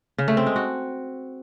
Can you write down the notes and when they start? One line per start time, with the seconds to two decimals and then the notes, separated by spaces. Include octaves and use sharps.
0.18 C#3
0.28 A3
0.37 C4
0.46 G#3
0.56 F#4